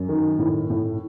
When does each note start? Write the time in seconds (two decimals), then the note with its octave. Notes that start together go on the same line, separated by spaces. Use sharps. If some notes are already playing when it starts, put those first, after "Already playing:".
Already playing: F#2
0.09 D#3
0.39 A2
0.70 A2